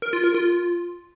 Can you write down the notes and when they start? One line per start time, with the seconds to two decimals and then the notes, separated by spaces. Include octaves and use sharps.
0.02 A#4
0.13 F4
0.24 A#4
0.34 F4